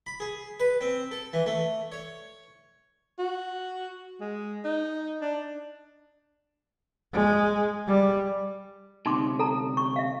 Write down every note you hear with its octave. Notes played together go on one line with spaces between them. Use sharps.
B5
G#4
B4
C4
A4
E3
A3
C#5
F#4
G#3
D#4
D4
G#3
G3
D2 C3 D#4 C6 D6
A4 A5 A#5
C#6
E5 F5